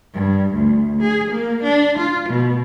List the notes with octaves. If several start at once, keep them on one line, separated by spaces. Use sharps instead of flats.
G2
D2
G#4
A#3
D4
F4
B2